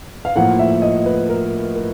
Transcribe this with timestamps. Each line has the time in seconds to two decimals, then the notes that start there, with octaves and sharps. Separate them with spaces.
0.25 F5
0.36 A2 F3 A#3 F#5
0.59 E5
0.82 D#5
1.06 B4
1.29 A#4
1.76 A#4